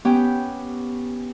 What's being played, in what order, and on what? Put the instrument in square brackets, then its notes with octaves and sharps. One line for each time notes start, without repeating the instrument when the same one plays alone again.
[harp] B3 C#4 G4 G5